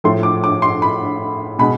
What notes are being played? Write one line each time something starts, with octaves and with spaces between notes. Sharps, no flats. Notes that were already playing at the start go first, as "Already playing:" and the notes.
A2 F3 A3 C6
D6
D6
C6
B5
B2 G#3 B5